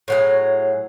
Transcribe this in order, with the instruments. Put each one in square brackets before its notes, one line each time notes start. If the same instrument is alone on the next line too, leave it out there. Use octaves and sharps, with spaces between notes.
[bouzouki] A2 F#3 G#4